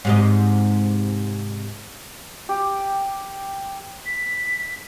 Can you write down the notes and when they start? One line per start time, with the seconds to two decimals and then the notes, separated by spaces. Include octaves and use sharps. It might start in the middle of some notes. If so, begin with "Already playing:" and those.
0.05 G#2 C3 D#5
2.49 G4
4.06 B6